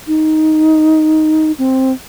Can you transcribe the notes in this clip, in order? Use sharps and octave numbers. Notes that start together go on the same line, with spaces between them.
D#4
C4